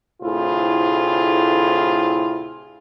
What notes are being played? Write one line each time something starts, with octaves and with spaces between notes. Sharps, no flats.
D2 A2 C3 E4 F4 G#4